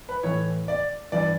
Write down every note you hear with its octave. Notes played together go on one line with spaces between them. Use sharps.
B4
A2 E3 C#5
D5
G2 E3 D5